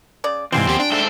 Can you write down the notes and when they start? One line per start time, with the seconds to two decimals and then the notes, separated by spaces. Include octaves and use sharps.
0.24 C#3 D5
0.53 G#2 C3 E3 G3 C4 F4 G#5
0.67 D#2 F3 B3 G4
0.80 D4 G5
0.92 G#2 A4 C5 E5 G5